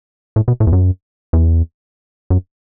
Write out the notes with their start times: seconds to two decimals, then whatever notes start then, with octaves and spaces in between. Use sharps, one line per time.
0.36 A2
0.48 B2
0.60 A2
0.67 E2
0.73 F#2
1.33 E2
2.30 F#2